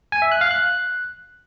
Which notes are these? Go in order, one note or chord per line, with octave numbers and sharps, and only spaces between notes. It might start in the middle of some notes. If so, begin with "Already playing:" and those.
G#5
E5
F#6
F5
F#6